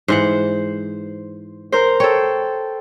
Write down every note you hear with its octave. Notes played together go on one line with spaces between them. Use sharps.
G#2 E3 C5 F#5
A#4 C5
A4 C#5 G5